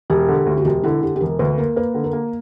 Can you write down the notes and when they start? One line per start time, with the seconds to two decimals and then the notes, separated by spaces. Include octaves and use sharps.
0.10 E1 G4
0.29 D3
0.46 D2
0.57 F#4
0.65 E1 G4
0.83 D3 E4
1.02 D3 G4
1.16 G4
1.21 E1 A#4
1.39 D2 B4
1.58 A#3 A#4
1.76 A#3 B4
1.94 D3
2.04 A#4
2.13 A#3